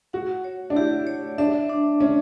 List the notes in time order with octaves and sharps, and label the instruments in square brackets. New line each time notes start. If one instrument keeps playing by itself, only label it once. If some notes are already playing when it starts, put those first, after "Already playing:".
[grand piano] F#4 [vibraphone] F#5
[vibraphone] C#5
[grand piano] D4
[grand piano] E4 [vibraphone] G4
[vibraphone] C#5
[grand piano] D4 [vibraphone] E5
[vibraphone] D4
[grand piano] C#4 [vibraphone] D4